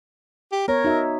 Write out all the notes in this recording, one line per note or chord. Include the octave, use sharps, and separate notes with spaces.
G4
B3 A#4 C#5
D#4 F#4 E5